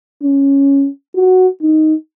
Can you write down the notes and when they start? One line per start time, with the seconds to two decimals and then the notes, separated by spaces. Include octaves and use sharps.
0.23 C#4
1.16 F#4
1.62 D#4